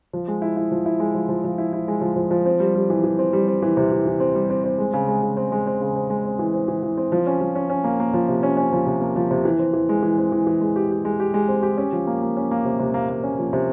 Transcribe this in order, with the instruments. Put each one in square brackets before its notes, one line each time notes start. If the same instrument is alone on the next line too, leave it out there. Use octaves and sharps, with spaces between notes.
[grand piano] F3
G#3
E4
E4
F3
E4
G#3
F3
F3
F3
E4
E4
G#3
F3
F3
F3
C4
G3
G3
E3
E3
C4
G3
C4
E3
C3
E3
E3
C4
G3
C4
C4
G#3
C#3
G#3
C#3
C4
G#3
C4
C#3
C4
G#3
C4
E3
C4
E3
E3
C4
F3
C#4
F3
C#4
C#4
A#3
A#3
F3
C3
C#4
C#4
F3
C3
A#3
F3
C3
E3
C4
E3
G#3
E3
C4
E3
E3
G#3
G4
G4
G#3
G4
G#3
C4
G4
C#4
F3
A#3
A#3
C#4
A#3
C3
C3
A#3
A#3
C#4
F3
C3